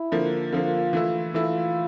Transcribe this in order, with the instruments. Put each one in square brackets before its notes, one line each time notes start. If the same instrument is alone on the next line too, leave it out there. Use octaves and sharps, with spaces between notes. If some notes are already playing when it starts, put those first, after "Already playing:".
Already playing: [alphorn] E4
[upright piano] D3 F3 A#3
[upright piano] D3 F3 A#3 [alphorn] F4
[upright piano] E3 A3 E4
[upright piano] E3 A3 E4 [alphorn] F4